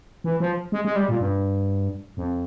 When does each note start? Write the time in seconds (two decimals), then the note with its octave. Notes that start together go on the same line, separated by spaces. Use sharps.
0.24 E3
0.40 F3
0.72 G#3
0.85 G#3
0.96 G3
1.09 A#2
1.20 G2
2.17 F2